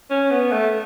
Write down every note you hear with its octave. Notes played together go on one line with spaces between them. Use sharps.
C#4
B3
A3